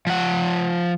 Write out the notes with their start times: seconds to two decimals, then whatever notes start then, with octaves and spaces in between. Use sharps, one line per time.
0.07 F3 F#5